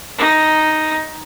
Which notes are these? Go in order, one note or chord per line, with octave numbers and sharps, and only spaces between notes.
D#4